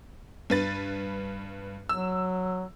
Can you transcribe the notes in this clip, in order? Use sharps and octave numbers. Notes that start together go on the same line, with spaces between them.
G2 B4 A6
F#3 E6